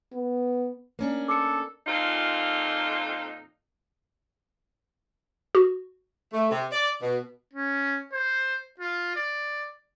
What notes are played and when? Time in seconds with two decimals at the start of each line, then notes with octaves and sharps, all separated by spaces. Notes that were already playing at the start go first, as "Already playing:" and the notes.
0.13 B3
0.99 A#3 C#4 D4
1.28 A4 D6 C#7
1.87 F2 A#2 C4 D#4 F4
5.55 F#4
6.33 A3
6.52 C3
6.72 D5
7.03 B2
7.54 C#4
8.13 C5
8.80 F4
9.16 D5